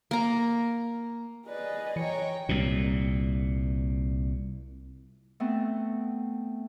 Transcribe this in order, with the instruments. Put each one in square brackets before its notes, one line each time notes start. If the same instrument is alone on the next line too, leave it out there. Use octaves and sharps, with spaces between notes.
[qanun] A#3 A#5
[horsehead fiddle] G#4 D#5 [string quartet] B4 [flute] D5
[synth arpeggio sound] E3 C#7 [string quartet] C#5 G5 A#5
[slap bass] C2 A#2
[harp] A3 B3 C4